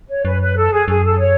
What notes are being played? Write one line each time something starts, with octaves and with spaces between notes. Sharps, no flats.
C#5
F#2 B4
B4
A4
G#4
F#2 G#4
A4
C#5